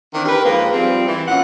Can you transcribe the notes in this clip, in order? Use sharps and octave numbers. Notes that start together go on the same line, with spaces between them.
D#3 E3 C4 D4
G4 A#4 B4
G#2 F3 A#3
F3 G3 C4
E3
A#2 F#3 C#4 F#5